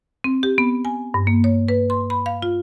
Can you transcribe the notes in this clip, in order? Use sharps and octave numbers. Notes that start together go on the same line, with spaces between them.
C4
G4
B3
G#5
G2
A#3
C#5
B4
C6
B5
F5
F4